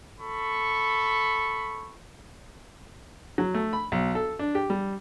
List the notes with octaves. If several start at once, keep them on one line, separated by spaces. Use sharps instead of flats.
A4 B5 C#6
F#3
A3
B5
B1
A4
D4
G4
G3